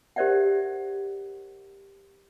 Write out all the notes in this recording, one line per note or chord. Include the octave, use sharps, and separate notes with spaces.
G4 A#4 C5 D5 E5 F#5